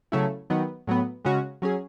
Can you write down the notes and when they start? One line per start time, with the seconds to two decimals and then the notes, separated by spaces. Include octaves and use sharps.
0.12 C#3 F#3 A3 C#4 E4
0.50 D#3 F#3 B3
0.87 A2 F#3 B3
1.25 C#3 G#3 C#4 F#4
1.62 F#3 C#4 G#4